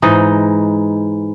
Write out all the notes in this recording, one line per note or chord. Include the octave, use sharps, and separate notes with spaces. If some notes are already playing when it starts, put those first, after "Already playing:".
G#2 E3 D#4 D#5